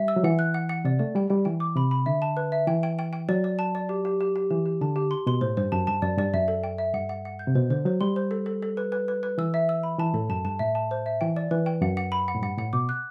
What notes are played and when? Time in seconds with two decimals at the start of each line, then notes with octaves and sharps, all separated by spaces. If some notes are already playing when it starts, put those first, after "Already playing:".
Already playing: G3 E5
0.08 E6
0.16 F#3
0.24 E3 F#5
0.39 F#6
0.54 F#5
0.69 F#5
0.85 C3 D5
0.99 A3 D5
1.15 G3 G5
1.30 G3 G5
1.45 E3 G5
1.60 D6
1.76 C3 B5
1.91 B5
2.06 D3 E5
2.22 A5
2.37 B4
2.52 E5
2.67 E3 G5
2.83 G5
2.99 G5
3.13 G5
3.29 F#3 D5
3.44 D5
3.59 A5
3.75 D5
3.89 G4
4.05 G4
4.21 G4
4.36 G4
4.51 E3 G4
4.66 G4
4.81 D3 A5
4.96 G4
5.11 C6
5.27 B2 C6
5.41 A2 C5
5.57 G2 C5
5.72 F#2 A5
5.87 G2 A5
6.02 F#2 D5
6.18 G2 D5
6.33 F#2 E5
6.48 A4
6.64 G5
6.78 E5
6.94 G2 F#5
7.09 F#5
7.25 F#5
7.39 G6
7.47 C3
7.55 B2 C5
7.70 D3 C5
7.85 F#3 C5
8.01 G3 C6
8.16 C5
8.31 A4
8.46 A4
8.62 A4
8.77 B4
8.92 B4
9.08 B4
9.23 B4
9.38 E3 E6
9.54 E5
9.69 E6
9.83 B5
9.99 E3 A5
10.14 A2 A4
10.30 F#2 A5
10.45 G2 A5
10.59 A2 E5
10.75 A5
10.91 C5
11.06 E5
11.21 E3 G5
11.36 D5
11.51 E3 B4
11.66 G5
11.81 F#2 F#5
11.97 F#5
12.12 B5
12.28 F#5
12.35 A2
12.43 G2 F#5
12.58 A2 F#5
12.73 B2 D6
12.89 F#6